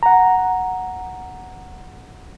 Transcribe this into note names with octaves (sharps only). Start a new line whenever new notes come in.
F#5 A#5